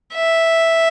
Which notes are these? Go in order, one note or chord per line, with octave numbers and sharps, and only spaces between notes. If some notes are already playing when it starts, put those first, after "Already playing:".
E5